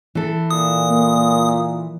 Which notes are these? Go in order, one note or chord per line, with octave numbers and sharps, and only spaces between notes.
E3 A4
A#2 D#6
A#3